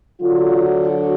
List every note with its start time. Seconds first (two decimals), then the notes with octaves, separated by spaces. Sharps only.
0.21 D3 F#3 D4 F4
0.85 F#4